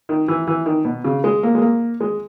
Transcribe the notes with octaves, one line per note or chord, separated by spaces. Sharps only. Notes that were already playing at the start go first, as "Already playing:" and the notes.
D#3
E3
E3
D#3
B2
C#3
G#3
A#3
G#3
A#3
G#3